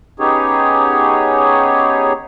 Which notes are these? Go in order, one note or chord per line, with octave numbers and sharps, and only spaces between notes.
B3 C#4 D#4 G4 G#4 C#5